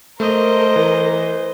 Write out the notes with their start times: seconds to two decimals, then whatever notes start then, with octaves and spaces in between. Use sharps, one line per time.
0.20 A3 A#4 C5 D#5
0.76 E3